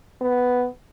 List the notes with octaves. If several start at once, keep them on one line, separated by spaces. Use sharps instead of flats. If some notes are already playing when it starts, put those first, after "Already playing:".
B3